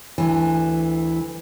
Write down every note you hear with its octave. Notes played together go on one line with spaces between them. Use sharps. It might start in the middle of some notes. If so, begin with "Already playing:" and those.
D2 E3